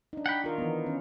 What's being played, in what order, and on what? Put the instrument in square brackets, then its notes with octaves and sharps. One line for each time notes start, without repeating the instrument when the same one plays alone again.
[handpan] D4 D#4
[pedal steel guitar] F#5 G5 B5
[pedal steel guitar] D#3 [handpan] F4 A#4
[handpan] E3 B3
C#4